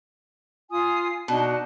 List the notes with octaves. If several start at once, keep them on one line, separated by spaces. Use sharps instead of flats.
F4 G#5 D#6
B2 D4 D#4 F#4